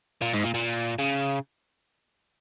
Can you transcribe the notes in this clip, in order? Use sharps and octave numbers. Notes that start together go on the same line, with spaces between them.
A#2
G#2
A#2
A#2
C#3